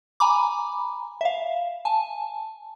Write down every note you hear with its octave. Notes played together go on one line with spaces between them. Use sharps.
G#5 A#5 B5 D6
E5 F5
G#5 A5